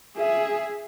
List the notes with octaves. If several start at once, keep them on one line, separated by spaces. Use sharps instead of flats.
G#4 E5